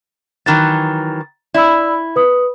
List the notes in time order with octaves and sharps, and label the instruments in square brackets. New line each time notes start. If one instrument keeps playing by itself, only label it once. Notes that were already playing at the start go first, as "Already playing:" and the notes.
[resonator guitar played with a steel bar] D#3 E3 F#3 [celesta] A6
[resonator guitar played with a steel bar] E4 [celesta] D5 B5 E6
[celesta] B4 D#6